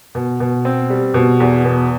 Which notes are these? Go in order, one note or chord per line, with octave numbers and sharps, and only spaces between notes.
B2
B2
C4
G3
B2
E2
B2